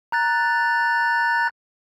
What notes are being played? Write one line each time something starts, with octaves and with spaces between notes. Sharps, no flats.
A#5 F#6 A6